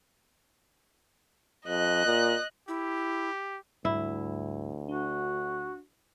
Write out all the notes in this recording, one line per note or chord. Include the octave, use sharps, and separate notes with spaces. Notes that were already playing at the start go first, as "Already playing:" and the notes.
F2 D#5 F#6
A#2
E4 G4
D2 G#2 G3 E4
D4 F#4